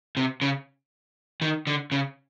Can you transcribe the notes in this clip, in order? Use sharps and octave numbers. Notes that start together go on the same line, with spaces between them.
C3
C#3
D#3
D3
C#3